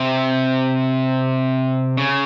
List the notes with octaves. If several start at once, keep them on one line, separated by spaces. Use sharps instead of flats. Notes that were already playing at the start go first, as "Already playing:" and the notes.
Already playing: C3
C#3